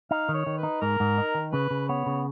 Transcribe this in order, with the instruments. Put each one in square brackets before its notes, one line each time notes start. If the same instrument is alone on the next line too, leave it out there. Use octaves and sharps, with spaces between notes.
[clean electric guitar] D#4 [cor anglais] F5
[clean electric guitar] D#3
[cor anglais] C#5
[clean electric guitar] D#3
[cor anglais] B4
[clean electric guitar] D#4
[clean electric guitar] G#2 [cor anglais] A#4
[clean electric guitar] G#2
D#4
D#3
[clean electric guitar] C#3 [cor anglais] B4
[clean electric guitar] C#3
[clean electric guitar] B3 [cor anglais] C#5
[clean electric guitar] C#3